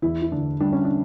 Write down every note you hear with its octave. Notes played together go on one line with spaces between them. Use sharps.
E2 E4
E4
D3 D4
G3 D4
C#4
D4